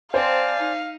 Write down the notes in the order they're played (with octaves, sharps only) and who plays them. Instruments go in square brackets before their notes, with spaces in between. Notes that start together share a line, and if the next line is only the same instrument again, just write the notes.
[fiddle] C4 A5 [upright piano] C5 [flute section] D5 G#5 [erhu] F5
[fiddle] D#4